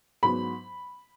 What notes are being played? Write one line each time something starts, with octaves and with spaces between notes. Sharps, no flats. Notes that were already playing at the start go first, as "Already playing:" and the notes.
G#2 F#3 B3 B5